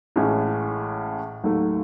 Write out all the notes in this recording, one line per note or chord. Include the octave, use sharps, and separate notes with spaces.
A1 A2 G#3 C#4
D#2 D#3 F#3 A3